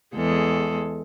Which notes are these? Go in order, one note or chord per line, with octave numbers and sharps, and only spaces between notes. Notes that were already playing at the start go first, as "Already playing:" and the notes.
E2 G#3 A4